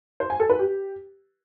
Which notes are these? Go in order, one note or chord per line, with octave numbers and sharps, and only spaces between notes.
C5
G#5
A4
B4
G4